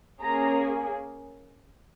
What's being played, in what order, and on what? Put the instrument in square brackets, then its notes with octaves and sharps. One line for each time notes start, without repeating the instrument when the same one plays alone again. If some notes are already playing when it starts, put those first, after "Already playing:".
[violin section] A#3 C#4 G#4 A#5